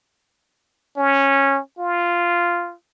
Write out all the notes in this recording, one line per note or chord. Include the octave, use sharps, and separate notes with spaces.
C#4
F4